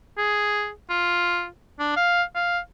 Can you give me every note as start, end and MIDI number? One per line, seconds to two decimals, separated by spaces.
0.18 0.69 68
0.90 1.46 65
1.79 1.95 62
1.96 2.23 77
2.35 2.58 77